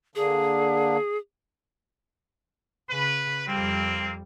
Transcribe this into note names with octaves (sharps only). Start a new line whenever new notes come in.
D3 A#3 D4 G#4
C#3 B4
F2 G3 A#3 C4